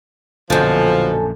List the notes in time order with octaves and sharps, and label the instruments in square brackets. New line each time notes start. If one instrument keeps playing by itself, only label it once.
[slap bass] A#1 F#2 [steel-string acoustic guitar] B2 D3 [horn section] F3 [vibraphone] A4 G#5 A5